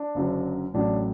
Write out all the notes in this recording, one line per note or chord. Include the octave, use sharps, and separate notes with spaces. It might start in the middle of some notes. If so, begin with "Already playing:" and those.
Already playing: D4
F#1 F#2 D3 F#3
A1 A2 F#3 D4